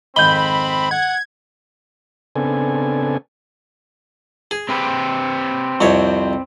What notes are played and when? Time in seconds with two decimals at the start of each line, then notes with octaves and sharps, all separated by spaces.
0.16 F2 G#2 D#3 C4 B5 G6 G7
0.91 F#5 G#6
2.36 C#3 B3 C4 D4 A4 G#5
4.51 G#4
4.69 C4 G4 B4
5.81 C2 F2 C#5